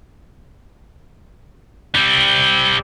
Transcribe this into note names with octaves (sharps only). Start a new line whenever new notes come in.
G3 C4